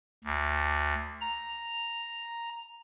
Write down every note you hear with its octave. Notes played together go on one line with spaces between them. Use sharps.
D2
A#5